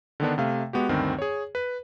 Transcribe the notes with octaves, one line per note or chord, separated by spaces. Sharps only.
D3 D#3 B3 D4
C3 A3 F5
G#3 B3 F#4 G4
D2 G2 D#3 C4
G#4 C#5
B4